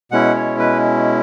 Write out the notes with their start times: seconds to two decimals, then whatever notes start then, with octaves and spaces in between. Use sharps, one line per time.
0.12 B2 G#3 C#4 E4 F#5
0.35 C#5
0.59 B4